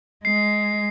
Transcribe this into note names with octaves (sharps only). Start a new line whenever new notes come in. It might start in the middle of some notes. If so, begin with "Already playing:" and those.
G#3 C7